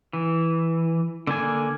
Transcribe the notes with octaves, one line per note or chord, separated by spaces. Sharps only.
E3
D3 A#3 G#5